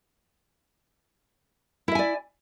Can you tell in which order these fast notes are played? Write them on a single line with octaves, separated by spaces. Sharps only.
E4 E5 G#5 D5